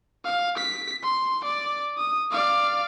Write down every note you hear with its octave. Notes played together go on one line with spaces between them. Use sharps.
F5
B6
C6
D5
D#6
D5 F5